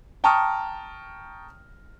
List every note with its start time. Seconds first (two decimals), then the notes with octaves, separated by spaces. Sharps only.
0.24 G5 A5 A#5 C#6 D#6 F6